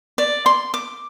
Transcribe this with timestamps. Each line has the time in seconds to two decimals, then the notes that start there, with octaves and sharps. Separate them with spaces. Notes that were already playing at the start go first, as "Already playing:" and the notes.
0.18 D5
0.46 C6
0.74 D6